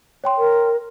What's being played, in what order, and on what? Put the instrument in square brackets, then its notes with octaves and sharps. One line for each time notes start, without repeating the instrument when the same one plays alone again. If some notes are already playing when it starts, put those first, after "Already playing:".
[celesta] C#5 G5 C6
[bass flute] A#4